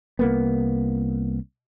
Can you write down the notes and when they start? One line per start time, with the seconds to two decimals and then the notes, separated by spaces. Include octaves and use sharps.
0.19 C2 A#3 B3